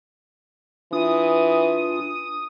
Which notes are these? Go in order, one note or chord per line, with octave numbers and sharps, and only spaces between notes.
E3 D4 F4 D#6